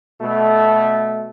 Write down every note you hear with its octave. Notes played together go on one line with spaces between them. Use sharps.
B2 A3